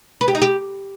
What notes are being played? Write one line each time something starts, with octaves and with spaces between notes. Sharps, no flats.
B4
G4
D#4
G4